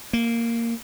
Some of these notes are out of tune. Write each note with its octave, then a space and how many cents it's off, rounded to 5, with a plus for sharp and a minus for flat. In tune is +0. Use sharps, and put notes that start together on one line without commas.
A#3 -10